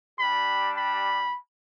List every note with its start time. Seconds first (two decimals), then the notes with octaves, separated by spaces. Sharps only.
0.19 G3 D4 G4 B5
0.77 B5